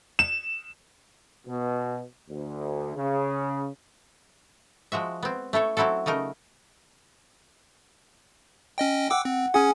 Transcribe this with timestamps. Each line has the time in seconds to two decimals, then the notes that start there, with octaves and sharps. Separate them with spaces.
0.19 E7
1.47 B2
2.30 D2
2.95 C#3
4.92 F3 G#3 F#4 E5
5.23 B3 C4
5.53 A3 E4 A4 C#5
5.77 F#3 C4 E4 F#4 A4
6.06 C#3 A3 D#4 A#4
8.78 C#4 D#5 G5
9.11 F#5 G5 D6 E6
9.25 C4
9.54 C#4 G#4 F#5